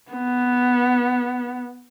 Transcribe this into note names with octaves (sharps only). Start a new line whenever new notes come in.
B3